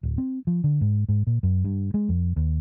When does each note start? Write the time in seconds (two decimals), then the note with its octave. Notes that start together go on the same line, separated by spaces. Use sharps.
0.03 D1
0.18 C4
0.47 F3
0.64 D3
0.81 G#2
1.09 G#2
1.27 A#2
1.43 F#2
1.65 G2
1.94 G#3
2.09 F2
2.36 D#2